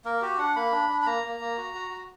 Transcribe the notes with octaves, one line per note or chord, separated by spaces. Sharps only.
A#3 A#4
F#4 G4
D4 F#5
A#3 B5
D4
D4
B5
A#3 A#5
A#3
A#3
F#4
F#4
F#4